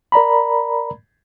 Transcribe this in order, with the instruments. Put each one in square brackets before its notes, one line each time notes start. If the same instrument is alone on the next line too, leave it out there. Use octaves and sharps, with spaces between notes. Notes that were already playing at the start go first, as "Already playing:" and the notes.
[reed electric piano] A#4 D5 A#5 B5